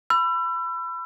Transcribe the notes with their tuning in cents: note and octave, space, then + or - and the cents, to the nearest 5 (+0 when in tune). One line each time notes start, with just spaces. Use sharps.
B5 +15 E6 +35